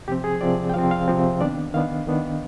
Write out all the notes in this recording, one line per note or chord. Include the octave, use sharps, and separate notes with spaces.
C3 F3 C4 G4
G#4
C3 F3 C4 D5
G5
C3 F3 C4 F5
F5
C3 F3 C4
D#3 B3 D4 D5
D#3 B3 D4 F5
D#3 B3 D4